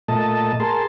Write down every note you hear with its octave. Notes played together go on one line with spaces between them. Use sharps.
A#2 A3 D#5 A5
G#4 A#4 A5 C6